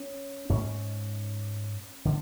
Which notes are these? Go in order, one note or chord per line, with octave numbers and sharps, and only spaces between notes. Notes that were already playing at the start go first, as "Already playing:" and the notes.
Already playing: C#4
G#2 C#4
D3